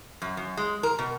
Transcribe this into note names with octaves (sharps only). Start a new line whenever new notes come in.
F#2
F#2
G#3
A#4
B2